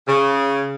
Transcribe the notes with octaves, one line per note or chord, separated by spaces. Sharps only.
C#3